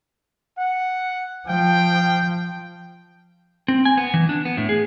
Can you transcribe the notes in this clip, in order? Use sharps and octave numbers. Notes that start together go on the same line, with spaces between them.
F#5
F3 F5 G5
C4
G#5
B3
E3
D4
B3
A2
G#4